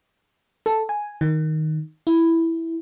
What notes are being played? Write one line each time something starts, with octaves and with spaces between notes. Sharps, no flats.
A4
G#5
D#3
E4